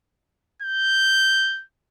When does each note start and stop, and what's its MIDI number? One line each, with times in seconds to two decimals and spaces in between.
0.63 1.64 91